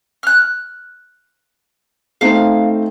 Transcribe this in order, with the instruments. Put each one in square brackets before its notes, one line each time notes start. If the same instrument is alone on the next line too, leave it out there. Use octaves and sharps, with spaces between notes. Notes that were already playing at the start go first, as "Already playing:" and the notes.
[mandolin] F6 F#6
[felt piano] A3 C4 D#4 [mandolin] F5